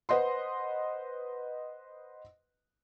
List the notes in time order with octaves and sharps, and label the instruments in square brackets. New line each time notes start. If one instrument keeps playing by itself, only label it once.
[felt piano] B4 C5 D#5 F#5 C6